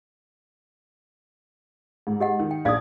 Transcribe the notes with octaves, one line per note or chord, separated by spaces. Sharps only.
G#2
G4 D#5 F#5
D#3
G5
A#1 D5 F5 D#6 G#6